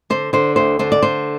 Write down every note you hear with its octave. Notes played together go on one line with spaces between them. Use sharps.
D3 C5
D3 C5
D2 C5
D3 C5
D5
D3 C5